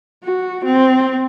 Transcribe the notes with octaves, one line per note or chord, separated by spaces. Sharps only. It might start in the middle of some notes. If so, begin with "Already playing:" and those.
F#4
C4